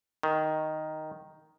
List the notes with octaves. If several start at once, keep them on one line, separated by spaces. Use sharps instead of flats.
D#3